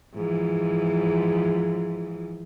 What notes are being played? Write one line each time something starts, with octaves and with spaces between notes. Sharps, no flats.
G#2 E3 F3